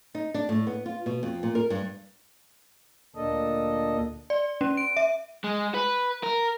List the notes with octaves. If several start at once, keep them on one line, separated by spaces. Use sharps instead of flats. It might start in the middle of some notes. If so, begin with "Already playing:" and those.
D#4
D4
A2
B3
F4
B2
F2
A#2
A#4
G2
D2 A#2 A#3 D4 A4 D#5
D5
C#4
D7
E5
G#3
B4
A#4